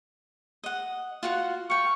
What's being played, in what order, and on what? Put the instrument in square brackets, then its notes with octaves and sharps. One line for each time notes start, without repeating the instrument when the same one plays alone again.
[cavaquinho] D#5 F#5
F4 F#4 F#5
[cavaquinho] F5 G5 [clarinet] C#6